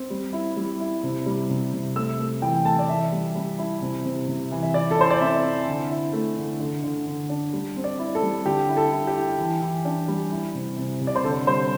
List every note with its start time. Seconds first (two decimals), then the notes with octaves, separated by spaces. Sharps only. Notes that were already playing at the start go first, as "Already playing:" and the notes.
Already playing: C4
0.10 G3
0.33 E4
0.56 G3
0.80 E4
1.03 C3
1.26 G3
1.50 C3
1.73 C3
1.96 A3 E6
2.19 A3
2.42 E3 G5
2.65 A3 A5
2.79 D5
2.89 E3 E5
3.12 G3
3.35 G3
3.58 E4
3.81 C3
4.05 C3
4.28 C3
4.52 E3
4.63 E5
4.74 E4 D5
4.91 A4
4.97 E4 C5
5.10 D5
5.21 C4 E5
5.44 E4
5.67 D3
5.90 E4
6.13 A3
6.37 D3
6.60 D3
6.83 D3
7.06 D3
7.29 D4
7.53 G3
7.76 C4
7.84 D5
7.99 E4
8.15 A4
8.22 G3
8.45 D3 G4
8.69 E4
8.77 A4
8.91 E4
9.07 G4
9.15 E4
9.38 E3
9.61 E3
9.85 D4
10.08 G3
10.31 E4
10.54 C3
10.77 C3
11.01 C3
11.07 D5
11.15 C5
11.24 D3 A4
11.47 G3 C5